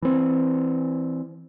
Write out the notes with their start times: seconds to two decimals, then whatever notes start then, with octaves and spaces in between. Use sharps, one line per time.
0.02 E3 C4